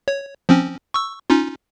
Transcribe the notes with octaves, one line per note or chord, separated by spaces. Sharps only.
C#5
F3 C4 C#4
C#6 E6
C#4 D#4 F4